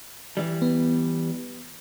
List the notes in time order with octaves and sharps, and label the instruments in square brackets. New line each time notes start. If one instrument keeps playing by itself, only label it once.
[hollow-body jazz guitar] E3 G3
[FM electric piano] B3